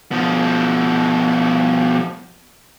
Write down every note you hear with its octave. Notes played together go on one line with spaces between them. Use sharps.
B2 F3